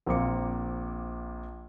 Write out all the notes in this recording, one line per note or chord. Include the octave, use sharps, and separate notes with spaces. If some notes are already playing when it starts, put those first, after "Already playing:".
A#1 A#3 C4 D6 C#7